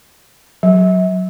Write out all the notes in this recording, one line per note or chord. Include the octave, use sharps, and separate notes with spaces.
F#3